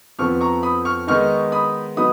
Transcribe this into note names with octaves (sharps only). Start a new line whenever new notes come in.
F2 F3 B3 C#6 F6
A#5 C#6
B5 D#6
C#6 F6
D#3 G#3 B3 D#4 C#6 F6
B5 D#6
F#3 B3 D#4 B5 D#6